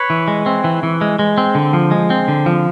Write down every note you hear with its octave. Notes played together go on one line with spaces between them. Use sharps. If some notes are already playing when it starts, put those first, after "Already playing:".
Already playing: B4 C#5
E3
G#3
C4
E3
E3
G#3
G#3
C4
D3
F3
G#3
C4
D3
F3